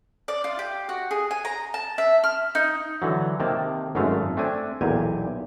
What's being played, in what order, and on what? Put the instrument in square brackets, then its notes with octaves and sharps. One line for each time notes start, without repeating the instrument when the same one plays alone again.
[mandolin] D5
F4
G4
F#4
G#4
G#5
A#5
A5
E5
F6
D#4
[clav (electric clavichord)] D3 E3 F#3
C3 D#3 A#3 A5
G#1 F#2 G#3 A3 F5
A3 C4 D4 G#5
B1 E2 A#2 G4 G#5